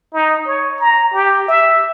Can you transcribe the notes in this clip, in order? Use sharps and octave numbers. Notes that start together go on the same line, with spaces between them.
D#4
C#5
A#5
G4
E5